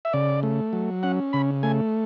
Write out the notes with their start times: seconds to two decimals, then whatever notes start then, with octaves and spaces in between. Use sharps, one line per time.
0.05 E5
0.13 C#3 D5
0.43 A3
0.73 F#3
1.03 C#4 F#5
1.33 C#3 B5
1.63 A3 G#5